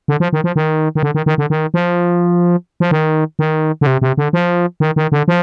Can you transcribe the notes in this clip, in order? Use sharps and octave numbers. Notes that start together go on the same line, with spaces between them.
D3
F3
D#3
F3
D#3
D#3
D3
D#3
D#3
D3
D#3
F3
F3
D#3
D#3
D3
C3
C3
D3
F3
D#3
D#3
D3
F3